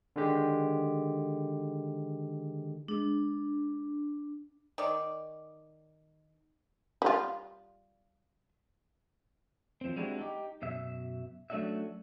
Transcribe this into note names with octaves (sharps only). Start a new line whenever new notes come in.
D3 D#3 G#3 G4
G#3 D4
D#3 D5
G3 F4
F3 C4
G3 G#3 C4 D4 E4 F#4
D#4 G4
F#2 B2 E5
F#3 A3 C#4 D4 F#4 E5